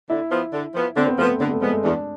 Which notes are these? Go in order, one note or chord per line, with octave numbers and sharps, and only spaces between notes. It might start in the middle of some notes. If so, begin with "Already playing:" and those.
D3 E4
F3 B3
D3
F3 B3
D3 C4
B3
F3 A3 B3
D3 B3
A3
F3 G#3 B3
A3
E2 D4